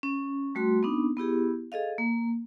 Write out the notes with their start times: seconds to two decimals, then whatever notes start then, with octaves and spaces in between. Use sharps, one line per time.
0.03 C#4
0.55 G3 A3 F#4 C6
0.83 B3 C4 D4 D#4
1.17 B3 E4 G4 G#4
1.72 G#4 A4 D#5 F5
1.98 A#3